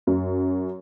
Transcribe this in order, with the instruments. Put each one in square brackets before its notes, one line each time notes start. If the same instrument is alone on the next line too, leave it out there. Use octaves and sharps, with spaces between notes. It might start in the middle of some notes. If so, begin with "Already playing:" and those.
[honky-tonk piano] F#2